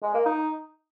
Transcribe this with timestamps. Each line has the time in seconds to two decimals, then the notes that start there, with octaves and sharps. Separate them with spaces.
0.03 G#3
0.14 A#3
0.25 D#4